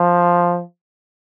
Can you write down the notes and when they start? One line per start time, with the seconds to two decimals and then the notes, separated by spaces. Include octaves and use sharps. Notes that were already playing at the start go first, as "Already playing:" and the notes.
Already playing: F3